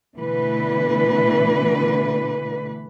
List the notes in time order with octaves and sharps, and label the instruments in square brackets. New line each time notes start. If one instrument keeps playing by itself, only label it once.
[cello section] B2 D3 E3 A3 B4